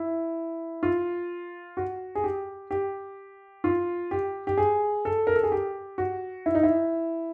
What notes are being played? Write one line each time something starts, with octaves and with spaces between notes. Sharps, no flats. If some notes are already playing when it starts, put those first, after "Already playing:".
Already playing: E4
F4
F#4
G#4
G4
G4
F4
G4
G4
G#4
A4
A#4
A4
G#4
G4
F#4
E4
D#4
E4